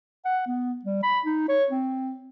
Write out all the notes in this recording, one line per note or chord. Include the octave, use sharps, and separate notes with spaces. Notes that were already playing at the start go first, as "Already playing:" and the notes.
F#5
B3
G3
B5
D#4
C#5
C4